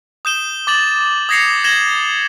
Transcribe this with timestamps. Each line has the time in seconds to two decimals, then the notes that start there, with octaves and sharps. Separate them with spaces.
0.25 D#6 G6 E7 G7
0.67 D6 A6 F#7
1.29 D#6 G#6 A#6 C7 C#7 F7
1.64 G#6 A#6 E7 F#7 G7